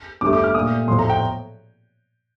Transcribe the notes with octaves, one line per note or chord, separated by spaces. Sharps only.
G2 D3 A3 D6
D6
F6
A#2 A3 D#6
A2 F3 A3 C6
A#5
G5